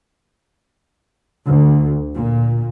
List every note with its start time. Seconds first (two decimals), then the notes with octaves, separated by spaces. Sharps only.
1.46 D2
2.14 A#2